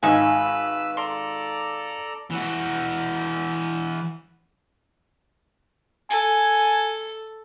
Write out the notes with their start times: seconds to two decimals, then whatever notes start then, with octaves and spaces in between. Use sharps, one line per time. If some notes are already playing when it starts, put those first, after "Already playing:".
0.03 G#1 G#2 D#4 B4 F5 G#5 B5 E6
0.97 A4 D5 A#5 C6
2.30 E3 F#4
6.10 A4 G#5